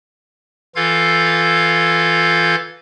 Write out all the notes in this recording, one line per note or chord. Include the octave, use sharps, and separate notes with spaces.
E3 F4 A4 F5 G6 G#6